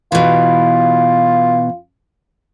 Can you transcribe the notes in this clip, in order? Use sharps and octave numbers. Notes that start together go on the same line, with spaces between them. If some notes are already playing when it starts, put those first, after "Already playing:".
B2 E3 F4